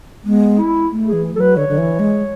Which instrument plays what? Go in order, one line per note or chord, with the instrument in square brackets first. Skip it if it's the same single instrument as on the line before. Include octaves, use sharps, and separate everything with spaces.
[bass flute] G#3 [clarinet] B3
[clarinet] E4
[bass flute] A3
[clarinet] G#4
[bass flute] E3
[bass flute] F#3 [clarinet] A4
[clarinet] B4
[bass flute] D3 [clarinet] C#5
[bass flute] D3
E3
G#3